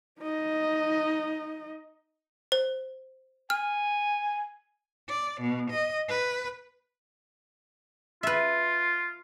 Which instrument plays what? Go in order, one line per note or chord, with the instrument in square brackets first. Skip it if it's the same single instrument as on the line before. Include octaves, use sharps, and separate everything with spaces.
[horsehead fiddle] D#4 D#5
[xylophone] C5
[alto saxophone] G#5 [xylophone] F6
[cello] D5
B2
D#5
B4
[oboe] F4 [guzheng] B4 E5